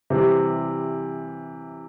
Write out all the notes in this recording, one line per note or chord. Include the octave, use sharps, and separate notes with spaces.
C3 E3 G3